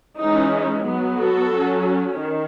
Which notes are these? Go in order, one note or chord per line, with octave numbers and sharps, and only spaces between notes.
E3 G#3 C#4 D#4
F#3 B3
F#4 A4
F#3 C#4
D#3